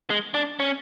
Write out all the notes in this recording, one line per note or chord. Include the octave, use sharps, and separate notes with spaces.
G#3
D4
C#4